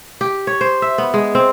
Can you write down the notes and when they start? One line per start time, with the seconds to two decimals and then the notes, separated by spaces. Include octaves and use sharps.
0.21 G4
0.47 C#5
0.61 C5
0.82 E5
0.98 B3
1.14 G#3
1.35 C4